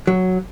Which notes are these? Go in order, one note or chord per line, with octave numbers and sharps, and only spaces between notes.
F#3